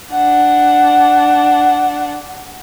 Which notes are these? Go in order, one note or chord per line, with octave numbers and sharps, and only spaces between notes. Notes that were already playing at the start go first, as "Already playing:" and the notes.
D4 F#5